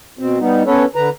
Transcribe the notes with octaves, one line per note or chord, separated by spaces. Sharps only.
B2 C4
G3 B3 D#4
B3 C#4 A4 B4 C#5
D3 B4 A#5